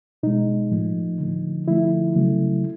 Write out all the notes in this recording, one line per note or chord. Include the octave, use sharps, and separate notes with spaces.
B2 G#3 D#4
A2 F3 A3
D3 F3 A3
D3 F3 A3 E4
C#3 F#3 A3